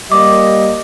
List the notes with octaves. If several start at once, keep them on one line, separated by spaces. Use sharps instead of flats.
G3 A#3 D#5 D6